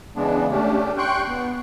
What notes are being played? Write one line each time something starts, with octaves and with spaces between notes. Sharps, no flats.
C#3 E3 G#3 B3 D4
A3 C#4 D4 G4
G5 C6 C#6 F#6 G6
B3